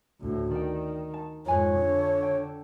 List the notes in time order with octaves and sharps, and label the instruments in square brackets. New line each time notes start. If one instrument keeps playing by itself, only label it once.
[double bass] D2 A2
[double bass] D#3 [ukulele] D5 G5
[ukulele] A5
[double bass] F2 G#2 [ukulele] B4 G#5 A#5 [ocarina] C#5
[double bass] D3
[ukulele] G5